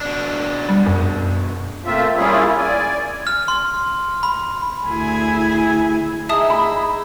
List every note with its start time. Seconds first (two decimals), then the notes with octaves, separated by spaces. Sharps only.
0.01 B2 D4
0.69 G3
0.86 F#2
1.85 A3 A#3 C4 F4 E5
2.17 G3 A#3 C#4 E4 F4 G#4
2.58 D5 G#5
3.27 F6
3.48 C6
4.23 B5
4.88 D2 E4 G#4 G#5
6.29 D#4 G#4 E5 A5 D#6 E6
6.50 B5